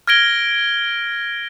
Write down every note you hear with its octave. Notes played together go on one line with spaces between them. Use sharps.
F6 G#6 A#6 D7 G7